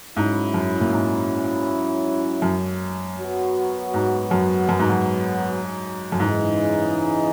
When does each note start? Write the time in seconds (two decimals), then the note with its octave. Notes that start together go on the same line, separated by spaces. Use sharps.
0.16 G#2 F#3 C#4 E4
0.54 F#2
0.81 A#2
0.92 G#2
2.42 F#2
3.19 F#3 B3 F#4
3.94 G#2
4.31 F#2
4.69 F#2
4.79 G#2
4.90 F#2
6.12 F#2
6.20 G#2 C#3 E3 G#3 D#4 G#4